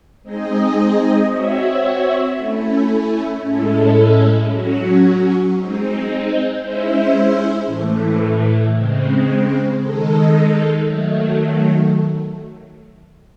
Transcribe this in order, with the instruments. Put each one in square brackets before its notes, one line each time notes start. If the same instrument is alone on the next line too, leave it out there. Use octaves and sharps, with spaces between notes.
[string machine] G#3 C4 D#4 G#4 D#5
C4 F#4 C#5 E5
A3 C#4 E4
A2 G#3 C#4 E4 A4
F#3 C#4 F#4
G#3 C4 D#4
G#3 C#4 E4 C5 E5
A2 E3 A3
C#3 G#3 C4
D#3 G#3 D#4 A4
D#3 F#3 A3